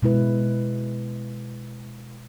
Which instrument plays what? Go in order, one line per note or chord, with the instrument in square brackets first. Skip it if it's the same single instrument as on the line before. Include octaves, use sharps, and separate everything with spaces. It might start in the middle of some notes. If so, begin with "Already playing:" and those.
[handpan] B2 G#3 E4 B4